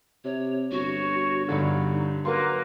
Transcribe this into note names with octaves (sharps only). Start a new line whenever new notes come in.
C3 C#5
G1 F#4 C#5
G2 D3 D#4
F#3 A#3 A#4 B4 F#5 C6